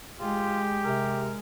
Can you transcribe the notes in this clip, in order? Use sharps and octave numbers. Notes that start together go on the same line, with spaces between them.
G#3 F4 G4
C3 A#4